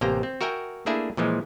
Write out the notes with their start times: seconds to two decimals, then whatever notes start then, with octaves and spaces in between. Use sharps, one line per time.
0.01 A1 C3 A#3 G5 A#5
0.23 C4
0.41 F#4 A#4 E5 G5 G#5
0.86 A3 A#3 D4 E4 G#4 E5
1.17 A#2 E3 F3 G#3